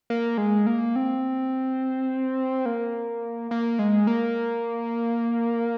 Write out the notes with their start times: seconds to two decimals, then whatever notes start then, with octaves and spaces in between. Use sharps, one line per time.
0.10 A#3
0.38 G#3
0.67 A#3
0.96 C4
2.66 A#3
3.51 A#3
3.79 G#3
4.07 A#3